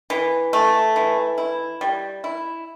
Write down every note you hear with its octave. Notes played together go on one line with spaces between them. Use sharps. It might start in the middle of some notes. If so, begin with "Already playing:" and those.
E3
A3
E3
E4
G3
E4